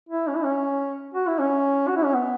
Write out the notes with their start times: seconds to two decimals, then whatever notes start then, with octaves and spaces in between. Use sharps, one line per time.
0.09 E4
0.28 C#4
0.35 E4
0.44 C#4
1.14 F#4
1.27 E4
1.39 C#4
1.88 F#4
1.96 E4
2.05 C#4
2.14 B3